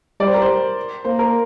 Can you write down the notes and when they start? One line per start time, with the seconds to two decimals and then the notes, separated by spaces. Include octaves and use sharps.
0.20 G3 D5
0.27 C5
0.34 A#4
0.42 C5
1.05 A#3 C5
1.19 A#4